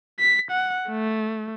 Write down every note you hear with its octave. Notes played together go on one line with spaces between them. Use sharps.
B6
F#5
A3